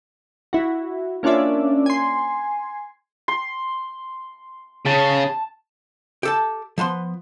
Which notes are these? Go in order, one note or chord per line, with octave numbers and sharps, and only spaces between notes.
E4 F#4
A#3 C#4 D4 F4 D5 E5
G#5 C6
C6
C#3 A5
G4 A4 A5
F3 B3 A5 C6